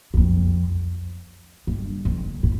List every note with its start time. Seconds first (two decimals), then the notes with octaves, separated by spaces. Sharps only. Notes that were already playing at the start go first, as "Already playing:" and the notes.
0.14 E2
0.17 F2
1.67 G2
2.05 F2
2.43 A2